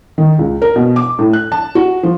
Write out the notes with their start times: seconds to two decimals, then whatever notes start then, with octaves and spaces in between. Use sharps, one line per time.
0.18 D#3
0.39 C#2
0.62 A#4
0.76 B2
0.96 D6
1.19 A2
1.33 F#6
1.52 A5
1.75 F#4
2.03 F3